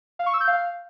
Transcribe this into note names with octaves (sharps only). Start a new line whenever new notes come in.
F5
C#6
E6
G6
F5